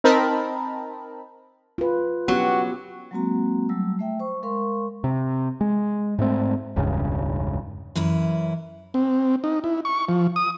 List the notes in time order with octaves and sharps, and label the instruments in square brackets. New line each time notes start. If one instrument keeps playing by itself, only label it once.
[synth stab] C4 D#4 A#4 A5 B5
[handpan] F4 B4
[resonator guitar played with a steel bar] F#3 [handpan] B3 C#4 G4 [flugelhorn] F#4
[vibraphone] F#3 G#3 A#3 C4 F#4 A#5
F#3 G3 A3 E6
A3 E5 G5
C5 C#6
G#3 A#4 F5 C6 C#6
[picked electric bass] C3
G#3
G#2 A3 C4
E1 C#2 G2 C#3
[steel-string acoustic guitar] F#2 E3 C#4 E4
[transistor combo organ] C4
D#4
E4
C#6
F3
D#6